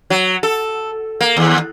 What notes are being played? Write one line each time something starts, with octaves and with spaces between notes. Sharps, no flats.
F#3
A4
A#3
D#2